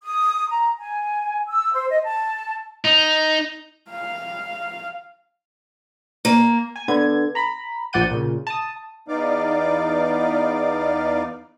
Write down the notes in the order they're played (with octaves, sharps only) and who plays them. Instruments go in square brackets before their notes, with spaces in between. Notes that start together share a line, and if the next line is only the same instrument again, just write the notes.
[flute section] D#6
A#5
G#5
E6
C5
D#5
A5
[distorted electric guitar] D#4
[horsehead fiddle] F5
[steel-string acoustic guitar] A#3
[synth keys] G#5
D3 B3 G#6
A#5 B5
A#1 F3 D5 F#5 G6 D#7
A#2 C#3
A5 D#6
[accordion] E2 B3 D#4 D5 F5 D6